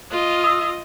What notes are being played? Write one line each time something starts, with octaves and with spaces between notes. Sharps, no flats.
F4 D#5
D#6 E6